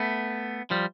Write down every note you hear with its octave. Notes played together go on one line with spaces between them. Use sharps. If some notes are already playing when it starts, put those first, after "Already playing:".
Already playing: A3 B3
F3 G3